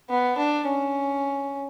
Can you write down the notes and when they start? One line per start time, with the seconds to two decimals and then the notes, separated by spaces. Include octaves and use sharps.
0.10 B3
0.38 D4
0.67 C#4